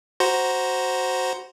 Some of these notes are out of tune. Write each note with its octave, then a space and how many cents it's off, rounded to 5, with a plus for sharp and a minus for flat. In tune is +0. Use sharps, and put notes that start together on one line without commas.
F#4 +5 C5 +0 A#5 +10